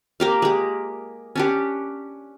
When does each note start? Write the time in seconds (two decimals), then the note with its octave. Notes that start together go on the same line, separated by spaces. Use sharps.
0.20 A#3 G4 F5
0.42 G#3 G4
1.36 C#4 D4 G4